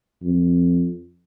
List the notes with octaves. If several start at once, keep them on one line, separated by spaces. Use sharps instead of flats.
F2